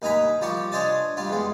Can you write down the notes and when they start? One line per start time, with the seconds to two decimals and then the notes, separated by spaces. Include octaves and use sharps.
0.02 D#2 D#4 G#5 A#5 B5
0.41 F3 G3 G4 C#6
0.72 D4 C5 C#5 D#5 G#5 A5
1.17 G3 F4
1.30 E2 G#3